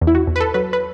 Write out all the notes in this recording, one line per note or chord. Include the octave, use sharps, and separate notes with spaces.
E2
E4
F#4
E2
B4
A4
F#3 B4
B4